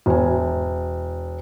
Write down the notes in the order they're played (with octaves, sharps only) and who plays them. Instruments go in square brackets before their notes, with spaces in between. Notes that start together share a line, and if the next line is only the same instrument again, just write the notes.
[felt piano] E1 G#5